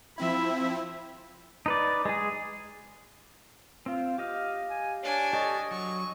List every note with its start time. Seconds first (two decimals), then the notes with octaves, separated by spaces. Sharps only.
0.18 F3 C4 E4 E5 B5
1.66 D#4 B4 D5
2.05 G#3 G#4
3.86 C4 F4
4.18 G4 D#5 F5
4.70 G#5
5.03 D4 C#5 G#5
5.33 G4 A4 C#5 D#5
5.71 F#3 C#6